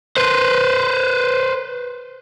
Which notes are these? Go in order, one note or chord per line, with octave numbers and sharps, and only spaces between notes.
B4 C5